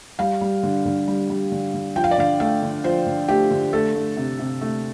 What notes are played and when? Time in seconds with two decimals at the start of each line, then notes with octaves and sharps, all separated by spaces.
0.19 G3 F5
0.41 G3
0.63 D3
0.85 D3
1.08 G3
1.30 G3
1.52 D3
1.74 D3
1.96 F3 G5
2.04 F5
2.11 D5
2.18 D3 F5
2.40 A3 F5
2.62 D3
2.84 F3 C5
3.07 D3
3.28 A3 G4
3.51 D3
3.73 A3 A4
3.95 A3
4.17 C3
4.39 C3
4.61 A3